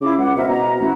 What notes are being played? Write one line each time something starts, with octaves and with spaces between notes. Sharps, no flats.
C#3 E4 F4 D6
C#2 C#5 F#5
B2 A#4 C5 E5
B2 A#5
A1 E4 F#4